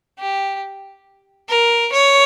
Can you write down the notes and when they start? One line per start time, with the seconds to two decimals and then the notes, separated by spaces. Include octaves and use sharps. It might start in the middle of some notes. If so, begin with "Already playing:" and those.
0.20 G4
1.49 A#4
1.92 C#5